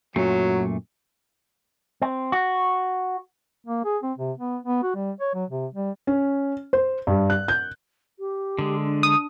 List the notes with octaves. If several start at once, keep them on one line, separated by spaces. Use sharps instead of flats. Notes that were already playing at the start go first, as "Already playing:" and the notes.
F#2 A#2 F#3 A3
C4
F#4
A#3
G#4
C4
C3
B3
B3
F#4
G3
C#5
F#3
C3
G3
C#4
C5
G2
F#6
G6
G4
D3 G#3
D4
D#6